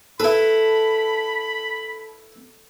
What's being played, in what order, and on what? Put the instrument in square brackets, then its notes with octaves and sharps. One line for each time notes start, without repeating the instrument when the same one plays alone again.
[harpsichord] E4 B4 [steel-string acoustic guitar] A4 [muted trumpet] B5